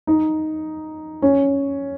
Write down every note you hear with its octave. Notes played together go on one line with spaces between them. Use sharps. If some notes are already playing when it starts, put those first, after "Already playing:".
D#4
C#4